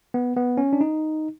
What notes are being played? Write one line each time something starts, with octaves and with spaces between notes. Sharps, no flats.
B3
B3
C#4
D4
D#4